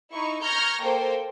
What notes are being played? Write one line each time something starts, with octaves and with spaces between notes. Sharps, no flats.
D#4 E4 C#6
A#5 C#6 F6 G6 G#6 A#6
A#3 A4 A#4 C5 G5